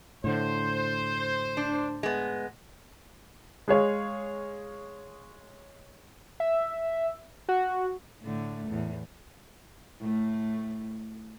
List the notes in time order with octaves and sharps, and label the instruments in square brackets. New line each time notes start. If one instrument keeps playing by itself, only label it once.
[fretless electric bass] A2 D3 [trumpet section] C5
[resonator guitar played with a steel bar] D4
G#3 B3
[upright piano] G#3 G#4 C#5 F5
[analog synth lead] E5
F#4
[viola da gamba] A2 D3 A3
E2 A2
A2 A3